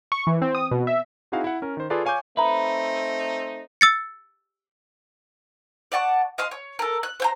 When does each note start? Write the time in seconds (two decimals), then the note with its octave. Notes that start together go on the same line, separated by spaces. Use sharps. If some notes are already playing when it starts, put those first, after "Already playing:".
0.12 C#6
0.27 E3
0.42 C4
0.55 D#6
0.71 B2
0.87 E5
1.32 C4 D#4 E4 F#4 G#4 F5
1.44 E4 F#5
1.62 C#4 A#4
1.77 D#3 C5
1.90 F4 G#4 A4 B4 D5 F5
2.05 C#5 F5 G#5 C#6 D6 G6
2.37 A3 C4 D#4 B4 E5 A#5
3.81 E6 A6 C#7
5.92 D5 F#5 A5 C#6
6.38 D#5 F5 C6
6.51 C#5
6.79 A4 A#4
7.03 F#6
7.20 C5 G5 A#5